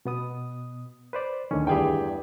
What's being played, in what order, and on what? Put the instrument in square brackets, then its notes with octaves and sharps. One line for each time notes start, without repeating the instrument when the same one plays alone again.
[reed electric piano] B2 B3 D#6
B4 C5 D5
[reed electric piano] D2 D3 D#3 [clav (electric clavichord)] C#4
[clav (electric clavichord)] E2 G2 [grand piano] G4 G#4 G5